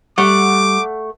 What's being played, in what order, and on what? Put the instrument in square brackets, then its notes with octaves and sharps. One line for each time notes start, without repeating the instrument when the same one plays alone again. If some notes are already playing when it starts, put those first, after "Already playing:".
[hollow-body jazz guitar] G3 [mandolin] A3 F#5 [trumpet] D6